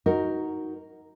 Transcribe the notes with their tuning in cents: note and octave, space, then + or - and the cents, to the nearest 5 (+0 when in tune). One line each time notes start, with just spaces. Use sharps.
D#4 +15 F#4 +0 A#4 +0